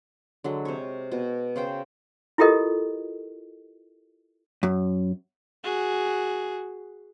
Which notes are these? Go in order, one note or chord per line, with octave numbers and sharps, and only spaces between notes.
D3 F#3 G#3
C3 C#5
B2
C#3 C5 G5
E4 F4 G4 A4 A#4 D#5
F#2
F#4 G#4